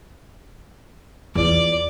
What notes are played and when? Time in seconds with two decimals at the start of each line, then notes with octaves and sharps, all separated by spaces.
1.35 E2 F4 D5